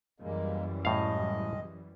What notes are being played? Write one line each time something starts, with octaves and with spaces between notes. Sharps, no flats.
F#2 E3 G3 G#3 A#3
A2 G#3 D#5 F5